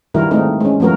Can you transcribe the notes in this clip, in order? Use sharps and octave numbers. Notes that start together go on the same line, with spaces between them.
D#3 G3 E4 F#4 A#4
G#3 A3 C4 D#4 A#4
G#3 C#4
F3 A3 B3 F#4 A#4